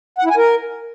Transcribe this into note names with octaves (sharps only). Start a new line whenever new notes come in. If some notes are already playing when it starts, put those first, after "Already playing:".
F#5
E4
G#5
A#4